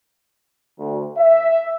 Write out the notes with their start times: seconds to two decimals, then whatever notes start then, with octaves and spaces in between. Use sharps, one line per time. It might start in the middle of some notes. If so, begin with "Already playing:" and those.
0.79 D2
1.18 E5